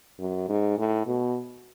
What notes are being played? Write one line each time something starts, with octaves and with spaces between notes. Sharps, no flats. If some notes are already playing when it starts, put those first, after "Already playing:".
F#2
G#2
A2
B2